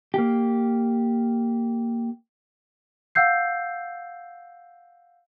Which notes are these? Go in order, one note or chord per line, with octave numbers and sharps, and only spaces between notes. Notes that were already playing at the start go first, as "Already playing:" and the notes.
A#3 G4
F5 F#5 E6 G6 C7